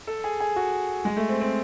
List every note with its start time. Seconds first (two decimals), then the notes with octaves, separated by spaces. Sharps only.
0.07 A4
0.24 G#4
0.40 G#4
0.56 F#4
1.05 G#3
1.17 A3
1.29 C4
1.41 C4